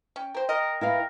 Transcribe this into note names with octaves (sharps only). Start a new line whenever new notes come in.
C#4 G5
A#4 C5
A#4 D#5
E4 A#4 B4 F5